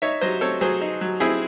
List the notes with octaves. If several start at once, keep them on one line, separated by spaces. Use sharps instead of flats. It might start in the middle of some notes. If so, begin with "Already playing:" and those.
D#4 C#5 E5
F#3 C5 D#5
C4 A4 C#5
F#3 G#4 C5
D#4
F#3
C4 E4 G#4